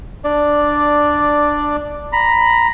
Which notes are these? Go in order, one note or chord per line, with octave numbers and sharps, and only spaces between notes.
D4 D5
A#5 B5